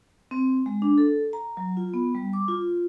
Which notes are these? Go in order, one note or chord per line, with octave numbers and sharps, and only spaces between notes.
C4
G#3
D4
A4
A#5
F#3
F4
B3
G3
D6
F4